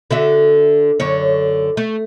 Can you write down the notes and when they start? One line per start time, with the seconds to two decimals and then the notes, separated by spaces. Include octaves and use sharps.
0.11 D3 F#4 E5
1.00 F#2 D3 C#5
1.77 A3